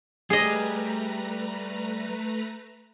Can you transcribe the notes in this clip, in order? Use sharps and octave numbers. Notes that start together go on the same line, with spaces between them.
G3 A3 G#4 B4 D#5 A#5